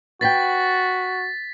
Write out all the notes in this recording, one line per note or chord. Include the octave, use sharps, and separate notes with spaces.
F#4 B4 F#5 G5 A6 B6